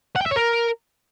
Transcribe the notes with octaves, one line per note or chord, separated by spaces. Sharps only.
F#5
G5
E5
C#5
A#4